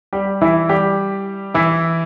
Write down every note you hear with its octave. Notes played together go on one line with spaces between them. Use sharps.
G3 G4
E3 E4
G3 G4
E3 E4